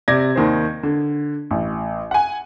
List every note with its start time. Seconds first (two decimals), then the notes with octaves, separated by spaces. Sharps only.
0.08 C3 D5 G#6 A#6
0.36 D#2 D#3 C5
0.83 D3
1.51 A1
2.11 F#5 G#5